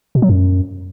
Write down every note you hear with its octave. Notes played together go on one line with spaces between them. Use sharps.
B2
F#3
F#2